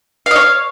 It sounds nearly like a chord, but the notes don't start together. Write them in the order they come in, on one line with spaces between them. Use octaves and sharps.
F5 D#5 C#5